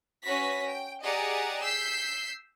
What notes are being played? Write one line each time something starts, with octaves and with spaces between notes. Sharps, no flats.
C#4 F#4 B4 A#6 B6
G5
G4 G#4 D5 D#5 F#5 A#5
E6 G6 B6 C7